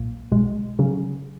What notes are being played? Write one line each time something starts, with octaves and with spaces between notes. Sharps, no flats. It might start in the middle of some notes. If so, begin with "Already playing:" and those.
Already playing: B1 A#2 A#3
B1 B2 G#3
C#3 F#3 C#4